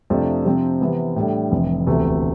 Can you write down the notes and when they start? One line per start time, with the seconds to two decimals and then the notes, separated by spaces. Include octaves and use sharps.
0.10 F2 C3 F3 A3 D4
0.45 C3 F3 C4
0.81 C3 E3 B3
1.16 A2 G3 D4 A4
1.51 F1 F2 E3
1.87 E1 D2 C3 E3 A3